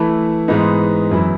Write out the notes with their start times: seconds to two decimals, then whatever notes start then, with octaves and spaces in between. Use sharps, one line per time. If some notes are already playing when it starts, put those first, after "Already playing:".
Already playing: E3 A3 E4
0.48 G#2 E3 G#3 B3 D#4
1.11 F#2 E3 B3 E4